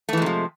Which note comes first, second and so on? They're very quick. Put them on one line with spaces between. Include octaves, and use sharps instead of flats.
A3 E3 G#3 C3 F3